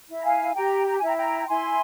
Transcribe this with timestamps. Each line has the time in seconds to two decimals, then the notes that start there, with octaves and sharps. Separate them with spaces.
0.08 E4
0.20 A#5
0.24 F5 G#5
0.55 G4 G5 A#5
0.87 A#5
0.97 E4 G#5
1.07 G5 A#5
1.17 G5 A#5
1.48 E4 G#5 C6